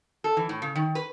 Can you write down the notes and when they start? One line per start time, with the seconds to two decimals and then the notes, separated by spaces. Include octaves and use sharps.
0.24 A4
0.37 E3
0.49 A2
0.62 C#3
0.75 D#3
0.95 B4